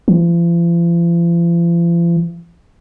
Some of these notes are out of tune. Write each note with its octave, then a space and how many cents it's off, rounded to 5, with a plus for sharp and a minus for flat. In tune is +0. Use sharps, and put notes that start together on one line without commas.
F3 -45